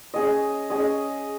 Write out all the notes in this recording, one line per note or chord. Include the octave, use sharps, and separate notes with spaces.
C#4 G#4 D#5
C#4 G#4 D#5